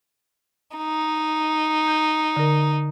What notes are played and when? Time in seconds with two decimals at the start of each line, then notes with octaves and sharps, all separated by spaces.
0.77 D#4
1.87 G6
2.36 D3 A#4